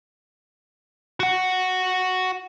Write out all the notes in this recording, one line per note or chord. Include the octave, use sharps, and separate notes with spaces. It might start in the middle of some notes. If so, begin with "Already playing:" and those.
F#4 F#5